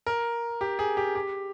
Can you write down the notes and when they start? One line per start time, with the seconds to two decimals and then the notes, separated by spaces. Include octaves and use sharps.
0.07 A#4
0.61 G4
0.79 G#4
0.97 G4
1.15 G4